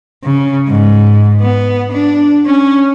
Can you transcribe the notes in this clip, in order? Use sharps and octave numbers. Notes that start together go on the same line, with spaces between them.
C#3
G#2
B3
D4
C#4